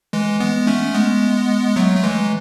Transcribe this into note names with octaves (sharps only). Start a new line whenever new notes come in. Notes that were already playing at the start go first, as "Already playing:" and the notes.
E3 G#3
G#3 B3
A3 C#4
G#3 B3
F#3 A3
A3
E3 G#3